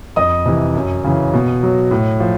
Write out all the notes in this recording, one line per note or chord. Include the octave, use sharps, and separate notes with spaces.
F2 D#5 D#6
C3 E3
F#2
C#3 E3
B2
F#3
A2
F3